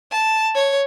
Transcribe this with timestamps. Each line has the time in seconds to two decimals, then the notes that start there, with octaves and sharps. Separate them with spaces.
0.12 A5
0.55 C#5